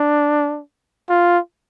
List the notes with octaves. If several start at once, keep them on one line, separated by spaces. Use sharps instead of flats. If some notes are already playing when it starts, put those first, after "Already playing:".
Already playing: D4
F4